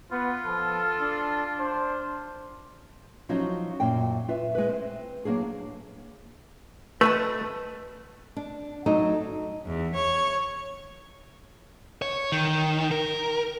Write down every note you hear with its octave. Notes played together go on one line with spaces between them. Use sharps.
B3 F4 B4
F3 A4
D4
D4 C5
F3 F#3 C#4 D#4
F#2 A#2 F5 G5
F4 B4 E5
G#3 B4
C4
F#3 A#3 D4 G#4
A3 B4 D#5 A5
D4
F#3 A3 D4 D#4
E2
C#5
C#5
D#3
A#4